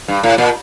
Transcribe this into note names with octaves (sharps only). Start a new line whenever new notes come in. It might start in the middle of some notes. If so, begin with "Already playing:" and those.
G2
A2
A#2